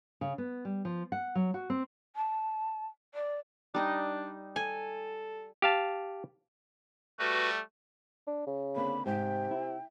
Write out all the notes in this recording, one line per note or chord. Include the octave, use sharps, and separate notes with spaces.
C#3
B3
G3
F3
F#5
F#3
F#4
C4
A5
D5
G3 D4 D#4 D#5
A4 G#5
G4 F5 A5
G3 A3 F#4 B4
D4
C#3
D3 A#3 C4 B5
G#2 C3 G5
E4